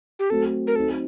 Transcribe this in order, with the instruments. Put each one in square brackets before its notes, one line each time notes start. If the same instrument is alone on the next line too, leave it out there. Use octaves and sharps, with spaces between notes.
[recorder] G4
[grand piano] F#3 A3 C4 F#4 [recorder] A4
[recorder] A#4
[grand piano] F#3 C4 D#4 [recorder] A4